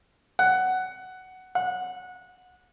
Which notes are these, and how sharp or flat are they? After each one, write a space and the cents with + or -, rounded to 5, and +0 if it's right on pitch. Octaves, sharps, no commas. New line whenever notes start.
F#5 +10
F#5 -20